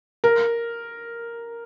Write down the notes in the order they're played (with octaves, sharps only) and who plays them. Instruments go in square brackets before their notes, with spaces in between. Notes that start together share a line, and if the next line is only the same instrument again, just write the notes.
[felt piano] A#4